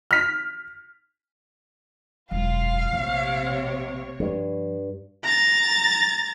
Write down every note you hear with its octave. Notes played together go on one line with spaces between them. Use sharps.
F6 B6
E1 F#2 F4 F5
A#1 A2 C3 C#5
G2 F3 G3
A#5 A6